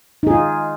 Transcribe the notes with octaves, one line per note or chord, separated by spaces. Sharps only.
D#4 F4 G#4